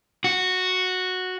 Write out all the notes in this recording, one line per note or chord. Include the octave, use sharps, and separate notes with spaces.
F#4